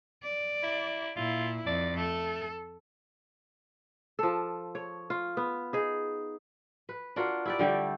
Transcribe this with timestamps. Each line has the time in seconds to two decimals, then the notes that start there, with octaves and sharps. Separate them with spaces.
0.24 D5
0.63 E4
1.17 A#2 E4 F4
1.67 F2 D5
1.97 A3 A4
4.19 F3 A4
4.75 C#5
5.10 F4
5.37 B3
5.73 D#4 G#4
6.89 B4
7.16 D4 F4 F#4 A#4
7.45 E4 G4 D5
7.59 D3 G3 A3 G4